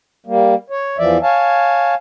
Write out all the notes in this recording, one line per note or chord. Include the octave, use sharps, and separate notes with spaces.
G3 A#3
C#5
E2 E3 F3 D5 E5
C#5 F5 G#5 A5